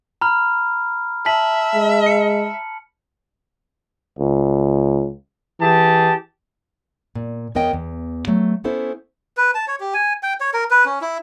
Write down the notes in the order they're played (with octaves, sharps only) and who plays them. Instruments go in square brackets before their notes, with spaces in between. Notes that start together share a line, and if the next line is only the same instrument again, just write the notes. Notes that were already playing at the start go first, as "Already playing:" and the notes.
[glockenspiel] A#5 B5 F6
[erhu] E5 [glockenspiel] A5 B6 F#7
[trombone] G#3
[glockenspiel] C#7
[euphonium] C#2
[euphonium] E3 [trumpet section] G4 G#4 A5
[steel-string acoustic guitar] A#2
E2 B3 A#4 C#5 D#5 G5
E2
F#3 A3
B3 C#4 E4 A4 C5
[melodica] B4
A5
C#5
G4
G#5
G5
C#5
A#4
B4
C#4
E4